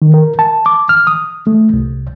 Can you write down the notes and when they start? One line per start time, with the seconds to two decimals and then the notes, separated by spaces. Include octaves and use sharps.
0.02 D#3
0.14 A#4
0.39 A5
0.66 D6
0.89 F6
1.07 D#6
1.47 A3
1.74 C2